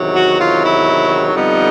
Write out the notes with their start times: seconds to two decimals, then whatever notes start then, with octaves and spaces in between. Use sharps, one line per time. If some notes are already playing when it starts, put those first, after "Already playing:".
Already playing: E2 C3 D#3 F#3
0.15 F#4
0.38 F4
0.62 E4
1.32 F2 D3 G3 B3 D#4